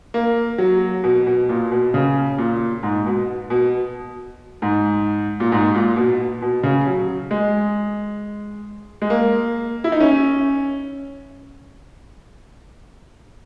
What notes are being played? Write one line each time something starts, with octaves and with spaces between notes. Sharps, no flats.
A#3
F#3
B2
B2
A#2
B2
C#3
A#2
G#2
B2
B2
G#2
A#2
G#2
A#2
B2
B2
C#3
F#3
G#3
G#3
A#3
E4
D#4
C#4